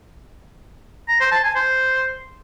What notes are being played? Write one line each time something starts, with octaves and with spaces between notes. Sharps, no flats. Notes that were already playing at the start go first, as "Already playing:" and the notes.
A#5
C5
A5
G#5
C5